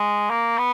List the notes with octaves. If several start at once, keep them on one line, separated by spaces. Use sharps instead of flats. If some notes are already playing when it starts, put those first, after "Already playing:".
Already playing: G#3
A#3
B3